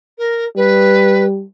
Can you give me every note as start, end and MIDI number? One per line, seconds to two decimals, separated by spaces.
0.18 0.45 70
0.57 1.44 55
0.57 1.24 71